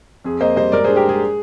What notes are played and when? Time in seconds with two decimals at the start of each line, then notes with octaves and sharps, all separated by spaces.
0.24 F2 G#4
0.40 A#3 C5 D#5
0.56 G3 C5 D#5
0.72 G#2 A#4 D5
0.84 G#4 C5
0.89 D4
0.96 G4 A#4
1.05 G#3 G#4